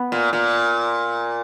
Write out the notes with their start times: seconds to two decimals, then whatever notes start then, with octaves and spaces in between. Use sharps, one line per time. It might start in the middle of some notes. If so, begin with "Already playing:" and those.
Already playing: B3
0.12 A#2
0.33 A#2